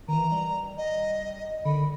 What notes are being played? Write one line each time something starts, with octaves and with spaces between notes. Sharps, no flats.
D#3 E3 A#5
G3
D#5
D3 D#3 B5